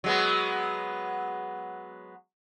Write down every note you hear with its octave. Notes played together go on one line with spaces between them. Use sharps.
F#3 G#3 B3